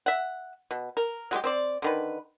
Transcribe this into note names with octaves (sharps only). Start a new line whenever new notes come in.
E5 F#5
B2
A#4
F#3 G#3 A3 G4
C4 C5 D5
D3 D#3 B4